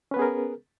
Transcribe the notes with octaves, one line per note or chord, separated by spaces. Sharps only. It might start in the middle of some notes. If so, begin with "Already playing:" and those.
B3 C#4 G#4 A#4 B4